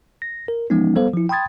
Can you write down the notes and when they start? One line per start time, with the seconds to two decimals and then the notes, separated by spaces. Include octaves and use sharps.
0.22 A#6
0.48 A#4
0.70 E3 F3 G#3 B3 C#4 D#4
0.95 G3 B3 A4 C5 F5
1.14 F3 E4
1.29 G5 B5 C6 D#6 G#6 A6